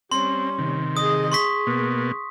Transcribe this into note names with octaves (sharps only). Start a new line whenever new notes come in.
G3 C4 C#4 C6
C3 D#3
G#4 D#5 D#6
G#4 C6 C#6 B6
B2 A#3 B3